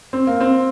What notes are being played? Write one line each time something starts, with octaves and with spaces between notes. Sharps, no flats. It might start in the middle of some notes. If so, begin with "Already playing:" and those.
C4
A#3
C4